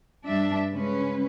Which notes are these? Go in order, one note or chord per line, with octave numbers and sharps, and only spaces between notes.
G2 D4 E5
C#3 G#3 C#4 B4